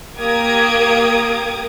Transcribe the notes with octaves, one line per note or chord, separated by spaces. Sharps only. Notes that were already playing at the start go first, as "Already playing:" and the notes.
A#3 G4 A#4 D#6 G#6 D7